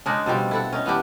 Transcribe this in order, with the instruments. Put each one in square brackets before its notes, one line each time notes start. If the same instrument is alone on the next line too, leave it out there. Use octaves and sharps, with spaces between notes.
[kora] C#3 G#3 D4 D#4
B2 F3 G3 C4
E4 A4 F#5
C#4 D#4
E3 B3 D4 G4